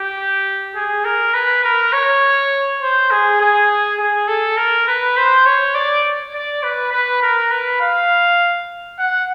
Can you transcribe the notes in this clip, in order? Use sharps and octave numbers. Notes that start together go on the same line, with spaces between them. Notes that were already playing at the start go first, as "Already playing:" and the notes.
Already playing: G4
G#4
A#4
B4
A#4
C#5
C5
G#4
G#4
G#4
A4
A#4
B4
C5
C#5
D5
D5
B4
B4
A#4
B4
F5
F#5